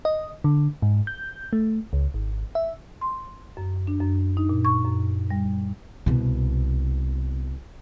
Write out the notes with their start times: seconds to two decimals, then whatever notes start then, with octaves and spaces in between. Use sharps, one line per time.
0.05 D#5
0.44 D3
0.82 G#2
1.07 G6
1.53 A3
1.93 C#2
2.14 G#1
2.55 E5
3.01 C6
3.57 F#2
3.87 D4
4.00 F#2
4.37 D#4
4.49 A#2
4.65 C#6
4.85 F#2
5.30 G3
6.06 C2 B2